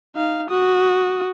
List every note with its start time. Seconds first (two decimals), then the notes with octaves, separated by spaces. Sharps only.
0.16 D#4 F5
0.50 F#4 D#6